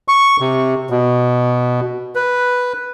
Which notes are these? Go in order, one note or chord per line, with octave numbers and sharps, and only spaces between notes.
C#6
C3
B2
B4